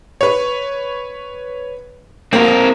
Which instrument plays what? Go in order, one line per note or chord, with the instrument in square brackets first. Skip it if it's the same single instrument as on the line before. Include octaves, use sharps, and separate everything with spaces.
[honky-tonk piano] B4 C#5
[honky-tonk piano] A#3 [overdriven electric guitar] C4 A#4